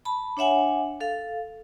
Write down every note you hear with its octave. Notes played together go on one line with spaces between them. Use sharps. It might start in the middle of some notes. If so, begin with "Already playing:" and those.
A5 B5
D4 C#5 E5 F#5 G#5
A4 F5